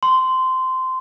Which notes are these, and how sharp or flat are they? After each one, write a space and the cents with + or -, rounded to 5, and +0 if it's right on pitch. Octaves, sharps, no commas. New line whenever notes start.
C6 -15